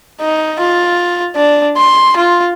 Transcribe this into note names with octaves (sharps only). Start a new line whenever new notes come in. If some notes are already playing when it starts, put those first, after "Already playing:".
D#4
F4
D4
C6
F4